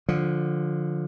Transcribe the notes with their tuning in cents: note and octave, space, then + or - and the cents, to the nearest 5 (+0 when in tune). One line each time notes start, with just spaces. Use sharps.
D3 +10 F3 +20